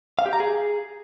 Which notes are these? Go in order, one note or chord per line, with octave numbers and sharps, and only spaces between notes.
F5
G4
A#5
G#4